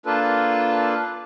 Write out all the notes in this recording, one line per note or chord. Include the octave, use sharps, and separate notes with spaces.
A#3 D4 F4 A4 B4